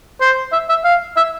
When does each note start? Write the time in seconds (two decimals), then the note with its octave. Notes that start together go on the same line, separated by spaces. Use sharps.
0.21 C5
0.52 E5
0.69 E5
0.84 F5
1.17 E5